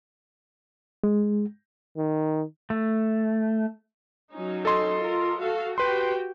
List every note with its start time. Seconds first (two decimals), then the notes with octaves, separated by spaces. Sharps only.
1.03 G#3
1.97 D#3
2.70 A3
4.32 F#3 C#4 D#4
4.65 A4 D#5 C6
4.98 F4 A#4
5.39 F#4 A4 F5
5.78 F#4 G4 B4 G5 C6